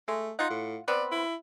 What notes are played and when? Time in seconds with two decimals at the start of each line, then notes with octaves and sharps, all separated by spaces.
0.08 G#3 A3
0.39 D#4 F4 F#5
0.50 A2
0.88 B3 C4 B4 D5
1.12 E4